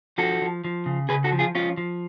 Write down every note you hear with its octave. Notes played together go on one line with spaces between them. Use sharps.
F3 F#4 A4
F3
F3
C#3
C#3 G#4 B4
F#4 A4
F3
F4 G#4
F3 C#4 F4
F3